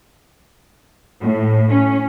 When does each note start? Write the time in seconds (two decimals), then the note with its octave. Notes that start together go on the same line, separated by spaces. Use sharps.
1.20 A2
1.70 C#4